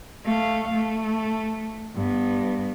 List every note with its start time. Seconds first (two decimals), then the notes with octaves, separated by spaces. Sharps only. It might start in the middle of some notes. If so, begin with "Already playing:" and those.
0.24 A3 F5
0.74 A3
1.95 G2 B3